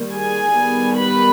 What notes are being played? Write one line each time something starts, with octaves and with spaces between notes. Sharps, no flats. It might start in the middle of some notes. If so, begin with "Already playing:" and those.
Already playing: D#3 G3 A#3
G#4 G#5
D#3 G3 B3
B4 B5